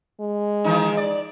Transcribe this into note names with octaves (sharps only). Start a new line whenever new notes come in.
G#3
D#3 E3 D#4
D5